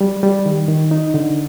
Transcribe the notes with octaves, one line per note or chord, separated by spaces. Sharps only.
G3
G3
D#3
D#3
D#4
D3